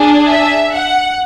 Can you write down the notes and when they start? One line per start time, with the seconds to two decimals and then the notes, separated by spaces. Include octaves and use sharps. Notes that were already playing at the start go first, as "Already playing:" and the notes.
Already playing: D4 G#4
0.27 E5
0.73 F#5